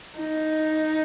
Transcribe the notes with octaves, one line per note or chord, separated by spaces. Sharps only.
D#4